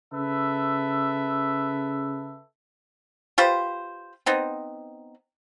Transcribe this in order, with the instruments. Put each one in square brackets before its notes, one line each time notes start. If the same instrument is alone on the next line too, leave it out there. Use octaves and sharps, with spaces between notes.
[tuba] C#3 [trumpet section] A4 B4 E5
[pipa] F4 G4 B4 C5
B3 C4 D#4